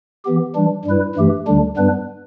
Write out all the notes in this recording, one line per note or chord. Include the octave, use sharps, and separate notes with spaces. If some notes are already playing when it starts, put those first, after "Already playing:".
E3 B3 G4
E3 G3 D4
G2 G3 E4 B4
G2 E3 A3 G4
D2 D3 G3 D4
G2 G3 B3 D4 B4